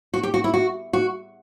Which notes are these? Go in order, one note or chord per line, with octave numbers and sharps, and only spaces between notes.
F#4
G4
F#4
E4
F#4
F#4